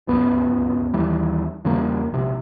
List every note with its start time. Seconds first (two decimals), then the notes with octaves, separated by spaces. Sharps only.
0.07 D1 G1 C#2 B3
0.94 D#2 E3 G3
1.65 E2 C#3 G3 A#3
2.10 A#1 C3